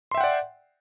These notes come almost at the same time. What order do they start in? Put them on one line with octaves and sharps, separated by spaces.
C6 E5 G5 F#5 D5